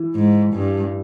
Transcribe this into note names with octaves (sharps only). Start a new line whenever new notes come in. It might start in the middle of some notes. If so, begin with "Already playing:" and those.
Already playing: E3
G#2
G2